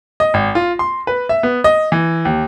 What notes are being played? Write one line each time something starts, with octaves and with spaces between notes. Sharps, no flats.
D#5
G#1
F4
C6
B4
E5
B3
D#5
E3
D#2